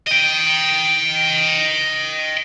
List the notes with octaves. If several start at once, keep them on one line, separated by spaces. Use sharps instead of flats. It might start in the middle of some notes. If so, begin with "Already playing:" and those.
D#5 G5